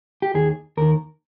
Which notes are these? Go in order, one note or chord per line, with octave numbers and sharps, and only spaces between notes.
G4
D#2 D#3 G#4
D#2 D#3 A#4